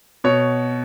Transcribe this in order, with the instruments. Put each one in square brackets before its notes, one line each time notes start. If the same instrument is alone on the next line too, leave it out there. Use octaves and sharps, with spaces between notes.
[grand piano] B2 C#5